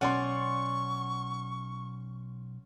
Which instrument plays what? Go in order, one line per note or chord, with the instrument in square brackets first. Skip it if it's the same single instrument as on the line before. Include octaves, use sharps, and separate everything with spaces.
[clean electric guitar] B1 [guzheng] C#4 D5 [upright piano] F#5 C6 [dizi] C#6